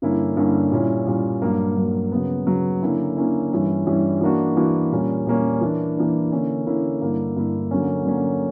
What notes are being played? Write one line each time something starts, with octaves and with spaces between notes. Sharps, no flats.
G2 D3 A#3 C#4 E4
G2 D3 A#3 C#4 E4
A#2 G3 C#4 E4
A#2 G3 C#4 E4
G2 F#3 A#3
G2 F#3 A#3
C#3 F#3 B3
C#3 F#3 B3
D3 A#3 C#4 E4
D3 A#3 C#4 E4
G2 E3 G3 C#4 E4
G2 E3 G3 C#4 E4
E3 A#3 D4 F#4
E3 A#3 D4 F#4
A#2 G3 A#3 C#4
A#2 G3 A#3 C#4
E3 A#3 D4
E3 A#3 D4
D3 A#3 C#4 E4
D3 A#3 C#4 E4
G2 D3 A#3 E4
G2 D3 A#3 E4
D3 F#3 A#3 C#4
D3 F#3 A#3 C#4